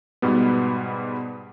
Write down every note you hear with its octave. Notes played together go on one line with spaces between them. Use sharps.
G#2 B2 G3 B3